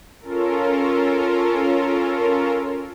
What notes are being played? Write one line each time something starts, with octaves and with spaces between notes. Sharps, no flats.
C#4 F4 A4 A#4